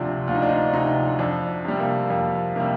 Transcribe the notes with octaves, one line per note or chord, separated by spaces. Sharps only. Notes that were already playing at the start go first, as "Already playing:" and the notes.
Already playing: D2 C3 F3 C4 D4
D2 F4
D#4
D4
D#4
C3 F3 D#4
F2 D4
C3 G3
A#3
F2 A#3
C3 G3 A#3